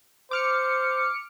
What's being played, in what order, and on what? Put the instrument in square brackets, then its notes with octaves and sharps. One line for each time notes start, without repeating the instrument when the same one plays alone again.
[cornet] C5 [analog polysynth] D6 F6 C#7